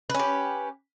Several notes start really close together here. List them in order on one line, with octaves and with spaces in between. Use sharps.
B4 C#4 G4